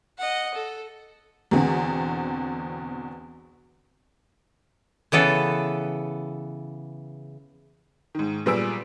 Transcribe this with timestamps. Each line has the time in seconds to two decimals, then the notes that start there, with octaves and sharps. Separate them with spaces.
0.18 D#5 F#5
0.54 A4
1.51 E2 B2 D3 B3 C4
5.12 C#3 E3 B3 A4
8.15 G#2 D#3
8.46 A#2 G3 B3 G#4 E6 D7